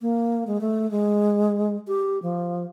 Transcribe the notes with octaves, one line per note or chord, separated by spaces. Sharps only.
A#3
G#3
A3
G#3
G4
F3